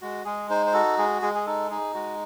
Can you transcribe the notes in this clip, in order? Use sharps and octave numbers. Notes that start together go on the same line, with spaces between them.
G#3 F#4
G#3 G#4
D#4 C5
C5
F#4 A4
G#3 G#4
G#3 G#4
G#4
D#4 A4
D#4 G#4
G#3 F#4